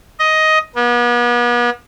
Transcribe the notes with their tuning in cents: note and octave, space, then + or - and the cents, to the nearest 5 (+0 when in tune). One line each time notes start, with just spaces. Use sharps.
D#5 +10
B3 -40